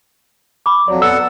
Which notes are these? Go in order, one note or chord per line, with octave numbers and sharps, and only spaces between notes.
B5 D6
F2 F#3 D5
B3 A4 F#5 E6